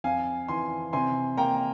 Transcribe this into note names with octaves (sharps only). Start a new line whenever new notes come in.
F2 F5 G#5
E3 G#5 C6
C3 G#5 C6
A#3 G5 A#5